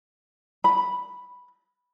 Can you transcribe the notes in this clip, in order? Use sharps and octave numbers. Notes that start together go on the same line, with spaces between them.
B5